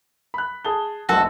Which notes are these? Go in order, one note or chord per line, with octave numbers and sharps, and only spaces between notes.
B5 F#6
G#4 A5 G7
F1 A#1 F#4 A4